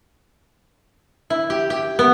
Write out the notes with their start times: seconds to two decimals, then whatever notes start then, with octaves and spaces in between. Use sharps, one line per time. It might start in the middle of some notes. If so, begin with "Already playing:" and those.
1.30 E4
1.50 G4
1.70 G4
1.99 B3